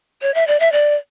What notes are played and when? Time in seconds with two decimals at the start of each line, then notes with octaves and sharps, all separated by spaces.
0.22 C#5
0.35 E5
0.47 D5
0.60 E5
0.72 D5